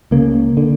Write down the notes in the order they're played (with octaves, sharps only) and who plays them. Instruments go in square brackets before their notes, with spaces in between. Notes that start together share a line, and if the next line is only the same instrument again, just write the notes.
[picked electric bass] C#2 C#3 A#3
D3